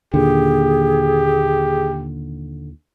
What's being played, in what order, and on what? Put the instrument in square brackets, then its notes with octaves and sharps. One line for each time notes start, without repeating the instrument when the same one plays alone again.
[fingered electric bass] D#2 A#2 [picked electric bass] D3 [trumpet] G4 [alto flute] G#4